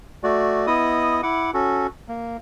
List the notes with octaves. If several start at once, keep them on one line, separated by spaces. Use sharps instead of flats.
A3 F#4 D5
B3 E4 D#5 D#6
E4 F#5 D6
C#4 F#4 A4
A#3